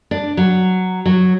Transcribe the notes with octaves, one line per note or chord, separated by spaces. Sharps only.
D4
F#3
F#3